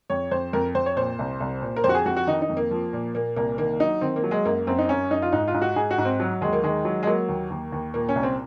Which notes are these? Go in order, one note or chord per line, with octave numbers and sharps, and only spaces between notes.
F2 C#5
F2 C5
F2 A#4
F2 C5
C#5
A#2 C5
C2
C2
A#2
A#4
F2 C5
F#4
G#4
F2 F#4
F#4
D#3 D#4
D#4
F2
A#3
F3
A#2
A#2 A#3
C2 A#3
D#3 A#3
F#3 D#4
D#3 C4
A#3
F#3
G#3
F#2 A#3
F#2 C4
D#4
F#2 C#4
F#2 D#4
F4
G#2 D#4
F4
G#2
F#4
G#2 G#4
F#4
G#2
C4
F#3
D#2 G#3
A#3
D#3 G#3
F#3
G#3
F#3 A#3
D#2
D#2
D#2
A#2 A#3
C#4
C2
C4